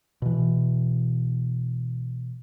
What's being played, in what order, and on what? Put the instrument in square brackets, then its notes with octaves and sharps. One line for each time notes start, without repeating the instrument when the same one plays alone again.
[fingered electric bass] B2 E3